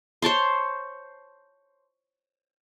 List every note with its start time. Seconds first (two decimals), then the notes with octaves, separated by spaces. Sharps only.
0.22 C5 C#5 A5 C6